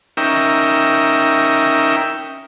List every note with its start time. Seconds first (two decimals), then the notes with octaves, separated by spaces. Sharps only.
0.17 C#4 D#4 A#4 E5 G5